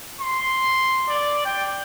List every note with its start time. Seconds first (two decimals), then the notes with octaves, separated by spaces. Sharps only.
0.21 C6
1.09 D5
1.45 G5